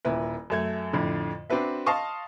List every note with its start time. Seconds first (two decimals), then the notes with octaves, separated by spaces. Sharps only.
0.05 D#1 A#2 E4 B4
0.50 F#2 A3 G#6
0.93 F2 A2 D3
1.50 C4 D4 F#4 B4 E5
1.86 D#5 F5 A5 C6 C#6 D#6